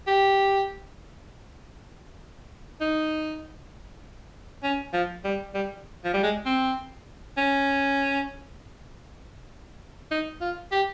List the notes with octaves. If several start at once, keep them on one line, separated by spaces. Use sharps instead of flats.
G4
D#4
C#4
F3
G3
G3
F3
G3
G#3
C4
C#4
D#4
F4
G4